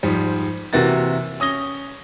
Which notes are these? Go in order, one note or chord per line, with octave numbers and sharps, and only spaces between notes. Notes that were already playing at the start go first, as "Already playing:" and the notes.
G#2 F3 G3
C3 E3 A#3 F#4 A6
C#4 D#6 A#6 G7